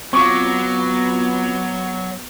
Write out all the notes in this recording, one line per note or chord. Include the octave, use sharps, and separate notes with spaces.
F#3 B3 C4 F4 C#6 D6